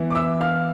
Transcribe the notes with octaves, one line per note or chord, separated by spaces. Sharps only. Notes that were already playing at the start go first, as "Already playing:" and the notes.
Already playing: E3 B3 E4
D6
E5 E6
F5 F6